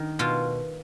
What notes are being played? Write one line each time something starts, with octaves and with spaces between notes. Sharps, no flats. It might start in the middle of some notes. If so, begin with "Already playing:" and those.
Already playing: D#3
B2 F4